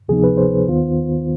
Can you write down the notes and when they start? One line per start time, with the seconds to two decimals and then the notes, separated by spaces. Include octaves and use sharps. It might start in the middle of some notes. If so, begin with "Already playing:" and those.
0.09 D2 C3 F3 B3 D#4 G#4
0.24 B4
0.37 C5
0.68 D#2 D#3 B3 F4